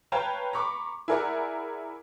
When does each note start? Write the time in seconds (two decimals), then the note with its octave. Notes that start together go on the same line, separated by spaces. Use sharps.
0.12 B4 C#5 F5 G5 A5 A#5
0.53 A#5 B5 C#6 D6
1.08 E4 G#4 A#4 D5 F#5